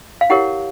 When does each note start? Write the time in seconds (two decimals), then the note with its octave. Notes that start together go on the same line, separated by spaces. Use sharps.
0.21 F5
0.30 E4 G4 A#4 C#5 F#5